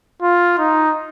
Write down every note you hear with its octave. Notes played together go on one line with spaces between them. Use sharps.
F4
D#4